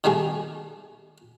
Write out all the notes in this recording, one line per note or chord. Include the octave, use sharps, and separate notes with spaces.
B2 D#3 G3 A3 G#4